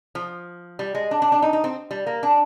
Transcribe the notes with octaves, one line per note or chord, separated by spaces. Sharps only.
F3
G3
G#3
D4
D4
D4
D#4
D#4
C4
G3
A#3
D4